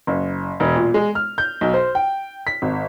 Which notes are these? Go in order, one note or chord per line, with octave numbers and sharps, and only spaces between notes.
F#1
E1
A#2
G#3
F6
G6
B1
C5
G5
B6
G#1